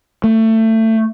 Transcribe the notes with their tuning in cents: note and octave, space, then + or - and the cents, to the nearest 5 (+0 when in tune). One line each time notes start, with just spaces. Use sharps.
A3 +20